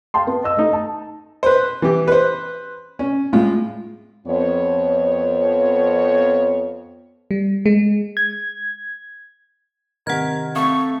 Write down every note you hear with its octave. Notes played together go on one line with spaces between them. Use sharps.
F5 G5 A5 C6
B3
D#5 E6
A3 D#4
A5
B4 C5
E3 G4
B4 C5
C#4
A2 G#3 F4
F2 B3 C#5
G3
G#3
G#6
C3 D#3 A#4 F#5 G#6
A3 C4 C#6